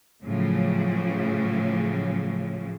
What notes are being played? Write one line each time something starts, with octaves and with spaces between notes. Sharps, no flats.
A2 C#3 F3 F#3